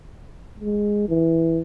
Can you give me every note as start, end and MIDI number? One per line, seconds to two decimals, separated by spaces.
0.60 1.06 56
1.09 1.61 52